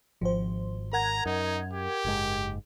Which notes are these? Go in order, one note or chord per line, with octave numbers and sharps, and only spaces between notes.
G#1 F3 C5
A#4 F#5 A#5 G#6
F#2 D#4
G4
F#1 G#2 G#3